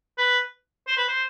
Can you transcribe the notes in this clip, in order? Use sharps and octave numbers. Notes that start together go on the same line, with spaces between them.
B4
C5
B4
C5